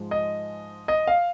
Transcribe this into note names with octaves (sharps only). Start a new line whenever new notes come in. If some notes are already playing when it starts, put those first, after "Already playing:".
Already playing: G#2 F3 G#3
D#5
D#5
F5